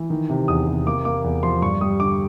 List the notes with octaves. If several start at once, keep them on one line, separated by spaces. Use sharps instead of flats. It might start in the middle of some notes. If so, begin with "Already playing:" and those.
Already playing: E3
D#3
C3
E2 D#6
C3
A#3 D6
A#3 D6
E2
F3 C6
G2 C#6
G3 D#6
D3 D6